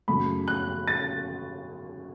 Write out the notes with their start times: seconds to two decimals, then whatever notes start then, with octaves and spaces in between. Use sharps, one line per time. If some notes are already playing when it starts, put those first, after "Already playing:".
0.08 F#2 C#3 A3 B5
0.48 F#6
0.88 A6